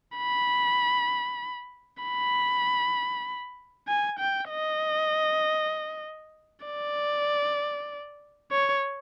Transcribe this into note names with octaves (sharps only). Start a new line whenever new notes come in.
B5
B5
G#5
G5
D#5
D5
C#5